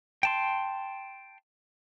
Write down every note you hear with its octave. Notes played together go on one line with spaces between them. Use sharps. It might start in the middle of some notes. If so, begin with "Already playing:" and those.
G5 A5 C6